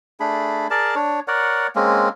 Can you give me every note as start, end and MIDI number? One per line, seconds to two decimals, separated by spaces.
0.20 0.67 57
0.20 0.67 62
0.20 0.67 68
0.20 0.67 83
0.70 0.95 68
0.70 0.95 70
0.70 0.95 74
0.70 0.95 81
0.95 1.20 62
0.95 1.20 73
1.28 1.67 70
1.28 1.67 73
1.28 1.67 74
1.28 1.67 78
1.75 2.09 56
1.75 2.09 58
1.75 2.09 60
1.75 2.09 61